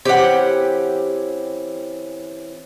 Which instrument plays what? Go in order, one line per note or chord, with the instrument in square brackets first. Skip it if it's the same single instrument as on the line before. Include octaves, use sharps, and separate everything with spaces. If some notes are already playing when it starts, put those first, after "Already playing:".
[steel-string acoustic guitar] E3 C4 C#4 [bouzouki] G4 F#5